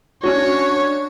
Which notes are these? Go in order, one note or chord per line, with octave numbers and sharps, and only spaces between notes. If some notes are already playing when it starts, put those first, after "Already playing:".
C#4 D4 F#4 C#5